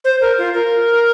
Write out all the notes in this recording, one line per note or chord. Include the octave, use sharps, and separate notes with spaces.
C5
A#4
F4
A#4